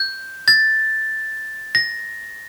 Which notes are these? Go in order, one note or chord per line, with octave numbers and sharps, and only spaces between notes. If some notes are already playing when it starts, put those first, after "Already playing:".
Already playing: G6
A6
A#6